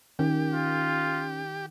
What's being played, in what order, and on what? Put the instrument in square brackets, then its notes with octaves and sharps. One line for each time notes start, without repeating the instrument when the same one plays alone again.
[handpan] D#3 [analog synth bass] C#4 [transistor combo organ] G4
[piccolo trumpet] F4